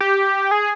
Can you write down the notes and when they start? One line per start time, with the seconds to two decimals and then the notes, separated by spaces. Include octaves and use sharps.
0.01 G4
0.51 G#4